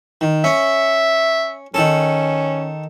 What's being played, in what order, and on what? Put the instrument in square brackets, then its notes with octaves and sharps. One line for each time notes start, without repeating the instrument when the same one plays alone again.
[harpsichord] D#3
[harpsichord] C#4 [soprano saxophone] E5
[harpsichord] D#3 A4 [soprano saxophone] C#4